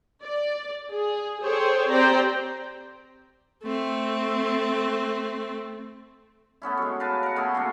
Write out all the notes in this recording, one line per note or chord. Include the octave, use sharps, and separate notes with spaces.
D5
G#4
G#4 A4 C5 C#5 G5
C4 G4 C5 D5 G5 A#5
A3 C4
A3 B3 C#4 E4
F#2 G#3
A#4 B4 F5 A5
A#4 F#5
B2 A3 G#4 A4
C#3 F#3 A3 A#3